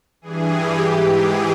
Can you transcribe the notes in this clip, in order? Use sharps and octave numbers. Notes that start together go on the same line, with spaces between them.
G2 E3 G#4
G4
G#2 E3
G#4